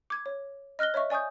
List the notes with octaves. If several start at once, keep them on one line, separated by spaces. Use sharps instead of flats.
D6 G#6
C#5
D#5 F6 F#6 A#6 G7
C#5 D#5 E5 C#6
D5 G#5 C#6 D#6 G6